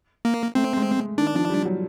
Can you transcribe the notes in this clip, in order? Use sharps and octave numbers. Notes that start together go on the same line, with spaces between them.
A#3
A3 C4
G#3
G#3
D#3 D4
F3
G3
F#3